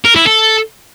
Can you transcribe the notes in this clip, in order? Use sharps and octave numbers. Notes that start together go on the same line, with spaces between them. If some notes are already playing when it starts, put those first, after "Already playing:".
A#4
E4
A4